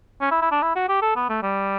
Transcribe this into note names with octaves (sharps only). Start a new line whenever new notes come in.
C#4
E4
E4
D4
E4
F#4
G4
A4
B3
A3
G3